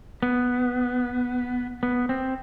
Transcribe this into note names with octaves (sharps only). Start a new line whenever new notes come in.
B3
B3
C4